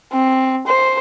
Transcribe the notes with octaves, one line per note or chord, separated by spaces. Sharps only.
C4
C5